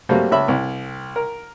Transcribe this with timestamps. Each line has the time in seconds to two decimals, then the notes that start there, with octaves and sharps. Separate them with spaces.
0.09 F#3 G3 A3 A#3 C4
0.31 C#2 C#5 E5 B5
0.48 C2
1.16 A#4